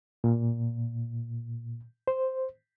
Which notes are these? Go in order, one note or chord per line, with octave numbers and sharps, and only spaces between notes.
A#2
C5